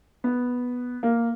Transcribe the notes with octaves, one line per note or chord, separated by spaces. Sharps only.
B3
A#3